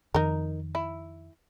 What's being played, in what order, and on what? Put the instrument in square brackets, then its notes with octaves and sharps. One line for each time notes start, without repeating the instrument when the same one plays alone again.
[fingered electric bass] F2 D#3 [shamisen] D#4 A#4
[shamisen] E4